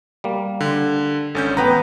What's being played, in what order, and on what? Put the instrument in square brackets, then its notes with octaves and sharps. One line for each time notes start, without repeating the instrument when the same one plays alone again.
[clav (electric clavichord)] G3 A#3
[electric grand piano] D3
[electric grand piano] G#1 C#4 G6 [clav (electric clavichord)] D3
[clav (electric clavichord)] A1 B3 G5 [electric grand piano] B4 A#5